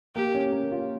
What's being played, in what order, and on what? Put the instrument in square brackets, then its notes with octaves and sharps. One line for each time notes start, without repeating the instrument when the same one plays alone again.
[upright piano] A#3 [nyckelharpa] G4
[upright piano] C#4
A#3
F4